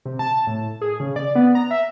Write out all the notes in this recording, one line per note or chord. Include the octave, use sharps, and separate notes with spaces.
C3
A5
A2
G#4
C#3
D5
B3
A#5
E5